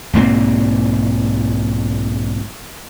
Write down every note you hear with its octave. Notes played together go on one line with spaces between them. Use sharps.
B1 G#2 A#3 C4